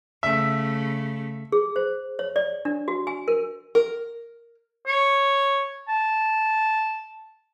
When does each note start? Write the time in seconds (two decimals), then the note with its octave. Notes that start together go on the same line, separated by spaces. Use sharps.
0.23 C#3 A3 E5
1.52 G#4
1.76 C5
2.19 C#5
2.36 D5
2.65 D4
2.88 F#4
3.07 G#5
3.28 A#4
3.75 A#4
4.87 C#5
5.88 A5